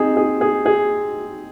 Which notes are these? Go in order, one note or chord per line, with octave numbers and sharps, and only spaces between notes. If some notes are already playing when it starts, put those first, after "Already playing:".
Already playing: C4 D#4 G#4
G#4
G#4
G#4